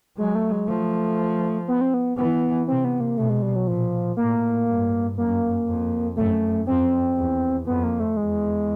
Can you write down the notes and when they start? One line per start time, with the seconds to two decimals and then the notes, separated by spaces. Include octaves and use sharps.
0.18 F#3 G#3
0.35 A3
0.52 G#3
0.68 F3 A3
1.68 B3
1.81 C4
1.94 B3
2.18 E3 B3
2.68 C3 C4
2.85 B3
3.00 A#3
3.17 B2 A3
3.30 G#3
3.42 G3
3.55 F#3
3.67 A#2 F3
4.17 A2 A#3
4.67 G2
5.17 F#2 A#3
5.67 F2
6.17 F#2 A3
6.67 F2 C4
7.17 E2
7.66 F2 B3
7.83 A#3
8.00 A3
8.16 E2 G#3